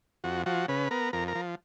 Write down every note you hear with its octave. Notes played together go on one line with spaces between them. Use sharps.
F2 F#4
F3 F#4
C#3 B4
B3 A#4
F2 A#4
A#4
F3